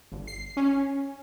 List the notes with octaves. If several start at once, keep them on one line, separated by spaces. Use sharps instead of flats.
G1
C7
C#4